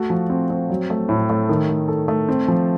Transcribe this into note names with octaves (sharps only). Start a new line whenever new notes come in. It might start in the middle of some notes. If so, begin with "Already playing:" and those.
Already playing: A3 F#4
F3
C4
C4
F#3
A3
A2
A3
D#3
A3
A4
A3
C4
F3